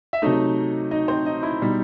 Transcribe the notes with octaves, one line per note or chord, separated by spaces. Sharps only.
E5
C3 F#3 A3 D#4 D#5
D#4 D#5
C4 C5
D#4 D#5
E4
B2 G3 D#4